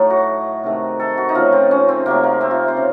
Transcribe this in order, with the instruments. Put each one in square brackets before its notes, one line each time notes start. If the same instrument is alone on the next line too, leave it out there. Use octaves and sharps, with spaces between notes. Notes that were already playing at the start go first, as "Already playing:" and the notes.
Already playing: [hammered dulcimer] A2 F#3 A3 D#4 A4
F#4
C3 D#3 A3
A4
F#4
D#4
C#3 F3 A3 F4
C4
C#4
C4
C3 F#3 A3 A#3
A#3
C4
F4
C5
C#3